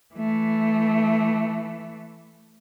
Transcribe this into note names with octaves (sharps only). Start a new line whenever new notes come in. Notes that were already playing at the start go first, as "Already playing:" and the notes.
E3 A3